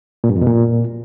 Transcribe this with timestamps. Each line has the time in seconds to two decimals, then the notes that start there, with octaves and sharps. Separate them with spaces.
0.24 A#2
0.30 G2
0.35 F2
0.41 B2
0.47 A#2